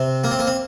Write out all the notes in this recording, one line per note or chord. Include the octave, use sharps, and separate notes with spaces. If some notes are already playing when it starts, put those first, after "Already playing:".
Already playing: C3 C4
A#3
C4
A#3
C4